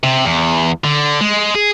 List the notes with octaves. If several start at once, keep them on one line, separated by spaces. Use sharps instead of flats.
C3
E2
D3
G#3
G#4